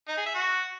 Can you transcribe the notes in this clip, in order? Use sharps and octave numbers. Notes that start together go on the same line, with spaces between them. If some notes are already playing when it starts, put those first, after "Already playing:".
D#4
G#4
E5
F#4